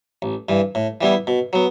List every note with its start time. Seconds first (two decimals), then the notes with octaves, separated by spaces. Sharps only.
0.22 A1
0.49 G2 E3
0.75 A2
1.01 E3 G3 B3 E4
1.27 B2
1.53 F#3 B3